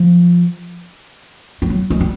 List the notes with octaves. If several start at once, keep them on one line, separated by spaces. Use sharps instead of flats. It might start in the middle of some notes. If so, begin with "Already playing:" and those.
Already playing: F3
G3
F#3
G#3
G3